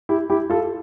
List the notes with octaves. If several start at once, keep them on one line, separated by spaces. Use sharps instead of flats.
E4 G4
E4 G4
F4 A4